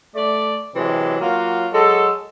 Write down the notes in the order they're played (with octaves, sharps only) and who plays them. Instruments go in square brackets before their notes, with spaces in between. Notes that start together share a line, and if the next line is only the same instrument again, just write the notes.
[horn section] A3 D5
C3 E3 F#3 G#3
F#3 A#3 F4 F#4
F#3 G#3 A4